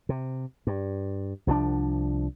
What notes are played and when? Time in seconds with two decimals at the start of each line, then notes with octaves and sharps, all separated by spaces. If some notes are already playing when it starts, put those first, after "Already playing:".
0.09 C3
0.67 G2
1.47 C2 F3 F#3 D4